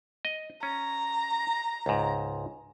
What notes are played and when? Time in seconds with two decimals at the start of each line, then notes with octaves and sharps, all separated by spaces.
0.25 D#5
0.63 C#4 A#5
1.86 C#2 G#2